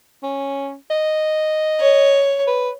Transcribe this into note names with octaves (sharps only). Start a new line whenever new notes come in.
C#4
D#5
C#5
B4